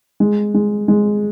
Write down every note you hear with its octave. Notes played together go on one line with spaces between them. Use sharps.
G#3
G#3
G#3